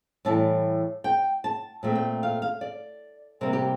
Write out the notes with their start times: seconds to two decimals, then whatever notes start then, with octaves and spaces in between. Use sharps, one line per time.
0.25 A2 E3 G3 A5
1.04 G5
1.44 A5
1.83 A#2 A3 C4
1.95 G5
2.23 F5
2.42 F5
2.61 D5
3.41 C3 G3 A#3 A#4
3.53 G4